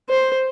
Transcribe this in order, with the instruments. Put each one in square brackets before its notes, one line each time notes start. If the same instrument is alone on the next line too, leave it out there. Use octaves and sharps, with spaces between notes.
[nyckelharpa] C5